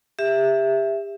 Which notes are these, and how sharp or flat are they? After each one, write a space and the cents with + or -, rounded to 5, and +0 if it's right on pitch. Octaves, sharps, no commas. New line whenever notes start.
G4 +30 E5 +5